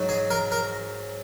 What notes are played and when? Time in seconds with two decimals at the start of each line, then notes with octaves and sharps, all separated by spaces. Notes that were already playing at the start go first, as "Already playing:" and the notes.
Already playing: G#2 F#3
0.09 G#4
0.30 A#4
0.52 A#4